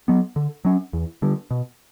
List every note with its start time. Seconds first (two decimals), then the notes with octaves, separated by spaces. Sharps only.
0.08 F#3 B3
0.36 D3
0.65 F#3 C#4
0.93 E2
1.22 D3 G3
1.51 B2